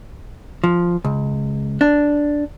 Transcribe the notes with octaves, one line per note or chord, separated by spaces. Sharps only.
F3
C#2
D4